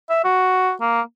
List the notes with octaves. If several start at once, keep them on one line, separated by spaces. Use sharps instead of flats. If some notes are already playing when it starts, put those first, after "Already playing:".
E5
F#4
A#3